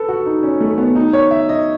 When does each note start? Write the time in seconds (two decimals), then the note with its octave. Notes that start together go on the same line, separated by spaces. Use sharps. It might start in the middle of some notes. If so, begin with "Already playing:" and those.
Already playing: A4 B4
0.08 F#4
0.26 D#4
0.43 C#4
0.61 A3
0.78 B3
0.95 D#4
1.13 C#5
1.31 E5
1.49 D#5